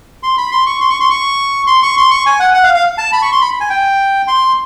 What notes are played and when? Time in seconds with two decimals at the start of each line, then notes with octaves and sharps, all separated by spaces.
0.23 C6
0.38 B5
0.51 C6
0.66 C#6
0.81 C6
0.90 C#6
1.00 C6
1.10 C#6
1.67 C6
1.83 C#6
1.97 C6
2.11 C#6
2.26 G#5
2.40 F#5
2.54 F#5
2.64 F5
2.74 F5
2.98 A5
3.12 B5
3.22 C#6
3.32 C6
3.41 B5
3.60 G#5
3.70 G5
4.28 C6